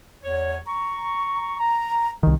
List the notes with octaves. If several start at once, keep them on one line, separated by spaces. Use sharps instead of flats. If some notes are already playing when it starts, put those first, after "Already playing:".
E2 C#5
A#5 C#6
A#5
C2 D#3